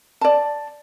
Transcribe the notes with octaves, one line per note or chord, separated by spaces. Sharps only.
D5 A5